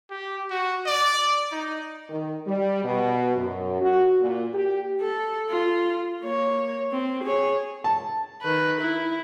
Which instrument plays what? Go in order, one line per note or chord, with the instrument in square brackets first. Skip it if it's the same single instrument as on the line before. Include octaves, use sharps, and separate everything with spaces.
[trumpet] G4
F#4
D5
D#4
[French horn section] D#3
G3
B2
F#2
F#4
A#2
G4
[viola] A4
F4
A#3 C#5
C4
G#4 C#5
[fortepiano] A5
[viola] D#3 B4
E4